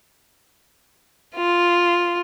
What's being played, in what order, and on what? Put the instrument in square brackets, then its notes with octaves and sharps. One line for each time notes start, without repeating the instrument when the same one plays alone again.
[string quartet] F4